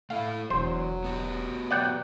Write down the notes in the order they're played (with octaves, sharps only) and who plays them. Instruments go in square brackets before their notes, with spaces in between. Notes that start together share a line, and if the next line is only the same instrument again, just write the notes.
[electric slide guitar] A3 E4 [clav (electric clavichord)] F5
[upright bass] E1 [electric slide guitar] E2 [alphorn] F#3 [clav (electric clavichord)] C5
[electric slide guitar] B3 F#4 G4
[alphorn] F#3 [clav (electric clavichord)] D5 F#5 G5